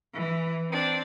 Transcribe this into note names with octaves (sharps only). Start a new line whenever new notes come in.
E3
C4 D4